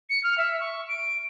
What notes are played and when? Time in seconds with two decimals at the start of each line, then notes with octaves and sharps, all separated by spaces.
0.10 C#7
0.23 F6
0.38 E5
0.60 C#6
0.88 D7